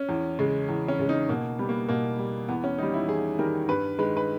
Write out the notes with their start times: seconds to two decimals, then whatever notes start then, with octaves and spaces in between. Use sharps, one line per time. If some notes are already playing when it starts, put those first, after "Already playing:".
Already playing: C#4
0.09 E2
0.39 C#3 G#3
0.69 E2
0.88 C#4
0.99 C#3 G#3
1.09 D#4
1.29 B2 A#3
1.59 G3 B3
1.69 A#3
1.89 B2 A#3
2.19 G3
2.49 E2 B3
2.64 C#4
2.78 D#3 G3 D#4
2.94 E4
3.08 E2 G#4
3.39 D#3 G3 A#4
3.68 G2 B4
3.99 D#3 G#3 B4
4.17 B4